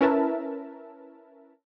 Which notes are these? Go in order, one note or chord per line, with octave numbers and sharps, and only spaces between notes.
C#4 E4 A#4 B4 E5 A5